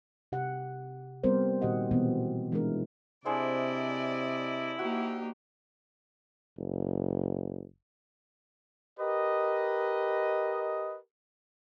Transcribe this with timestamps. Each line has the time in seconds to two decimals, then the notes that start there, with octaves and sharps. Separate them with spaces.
0.32 C3 G4 F#5
1.23 G3 B3 C4 A#4 C5 D5
1.62 A#2 D#3 F#4 G4 D#5 F#5
1.91 B2 E3 G#3 B3 C4
2.52 E3 G#3 C4 D4 E4 A#4
3.25 C3 D4 E4 G#4 C5 D5 D#5
4.79 A#3 D#4 F#4 G4
6.58 F#1
8.99 G4 A#4 B4 D#5